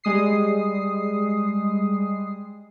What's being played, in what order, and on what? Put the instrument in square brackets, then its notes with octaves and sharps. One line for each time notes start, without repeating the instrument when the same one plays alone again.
[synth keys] G3 G#3 D#6 C7